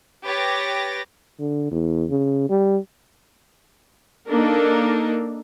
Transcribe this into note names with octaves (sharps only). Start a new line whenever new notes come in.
G4 B4 C#5 D6 A6 A#6
D3
E2
C#3
G3
A#3 D4 D#4 A4 A#4